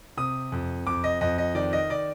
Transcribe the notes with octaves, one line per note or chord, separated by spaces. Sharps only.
C3 D#6
F2
F2 D6
D#5
F2 D#5
D#5
D#3 D5
D#5
D5